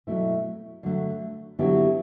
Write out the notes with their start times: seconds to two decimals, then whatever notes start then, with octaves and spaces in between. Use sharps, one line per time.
0.07 B2 F#3 A3 C4 E4
0.83 D3 F#3 A3
1.59 D3 F#3 B3 E4 G4